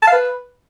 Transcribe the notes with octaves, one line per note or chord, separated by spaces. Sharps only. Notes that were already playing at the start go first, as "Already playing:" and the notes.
A5
F5
B4